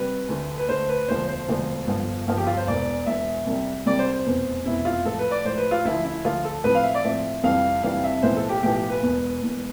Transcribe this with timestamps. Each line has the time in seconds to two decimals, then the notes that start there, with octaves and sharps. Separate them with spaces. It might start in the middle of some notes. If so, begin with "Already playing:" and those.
Already playing: C3 G3 C4 B4
0.29 D2 D3 A3
0.58 B4
0.68 D2 D3 A3 C5
0.89 B4
1.08 E1 D2 D3 F3 C5
1.28 C5
1.48 E1 D2 D3 F3
1.87 G1 G2 F3
2.27 G1 G2 F3
2.37 G4
2.47 F4
2.57 C5
2.67 E1 E2 B2 D5
3.06 E1 E2 B2 E5
3.47 C2 C3 G3
3.86 C2 C3 G3 D5
3.99 C5
4.12 C5
4.26 F1 E2 B2 B3
4.65 F1 E2 B2 B3 E4
4.85 F4
5.05 A2 F3 A3 A4
5.19 B4
5.31 D5
5.45 A2 F3 A3 C5
5.58 B4
5.71 F4
5.85 D2 D3 F3 E4
6.05 E4
6.25 D2 D3 F3 F4
6.45 A4
6.64 A2 F3 C4 B4
6.75 F5
6.83 E5
6.95 D5
7.04 A2 F3 C4 E5
7.43 F2 C3 E3 G3 D4 F5
7.83 F2 C3 E3 G3 D4 F5
8.04 E5
8.22 B1 A2 F3 B3 E4 C5
8.37 A4
8.49 G4
8.63 B1 A2 F3 B3 E4 G4
8.75 G4
8.89 B4
9.03 E1 E2 B2
9.43 E1 E2 B2